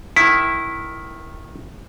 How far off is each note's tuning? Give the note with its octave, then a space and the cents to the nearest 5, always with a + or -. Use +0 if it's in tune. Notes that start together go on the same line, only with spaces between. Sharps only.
D#3 +0 E4 +0